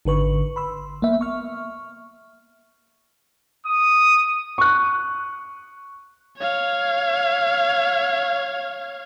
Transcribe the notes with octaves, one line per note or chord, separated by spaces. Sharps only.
G#1 D3 B4 C#6
B5 C6 E6
A#3 B3 E5
C#6 F6
D#6
C#6 F#6
C#5 F5